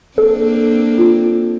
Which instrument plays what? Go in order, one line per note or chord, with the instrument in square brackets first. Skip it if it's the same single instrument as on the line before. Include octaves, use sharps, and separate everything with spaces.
[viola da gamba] A#3 C4 D4 [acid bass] A4
[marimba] F4